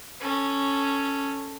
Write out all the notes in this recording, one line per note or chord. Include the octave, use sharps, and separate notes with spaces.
C#4 A4